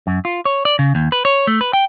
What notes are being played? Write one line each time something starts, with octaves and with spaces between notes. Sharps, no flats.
F#2
F4
C#5
D5
C#3
D#2
B4
C#5
A3
B4
G5